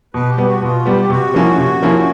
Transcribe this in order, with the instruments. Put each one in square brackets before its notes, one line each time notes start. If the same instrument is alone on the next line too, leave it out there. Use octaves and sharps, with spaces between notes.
[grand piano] B2 [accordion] B4
[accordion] G4
[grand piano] G3 B3
[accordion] F#4
[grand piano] B2 [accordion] F4
[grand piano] G3 B3 [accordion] G4
[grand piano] C3 [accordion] F#4
[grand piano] F3 A#3 C#4 E4
C3
F3 A#3 C#4 E4